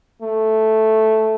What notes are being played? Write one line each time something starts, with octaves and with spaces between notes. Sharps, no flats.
A3